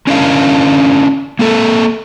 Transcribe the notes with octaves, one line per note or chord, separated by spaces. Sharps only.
C#4 D4 E4 A#4 D#5 F5
A#3 C4 A4